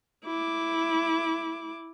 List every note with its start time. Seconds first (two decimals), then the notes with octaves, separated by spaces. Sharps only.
0.25 E4 D6